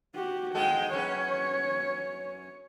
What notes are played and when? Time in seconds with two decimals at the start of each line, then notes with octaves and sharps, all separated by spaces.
0.15 F#4 G4
0.55 G#2 G#3 A4 G5
0.93 F#2 C#4 B4 C#5